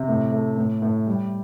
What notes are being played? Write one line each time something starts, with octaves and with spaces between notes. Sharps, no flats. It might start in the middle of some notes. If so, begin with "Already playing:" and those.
Already playing: C3
A2
A3
A2
A2
G3